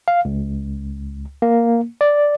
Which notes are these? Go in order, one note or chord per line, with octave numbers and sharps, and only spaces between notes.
F5
C#2
A#3
D5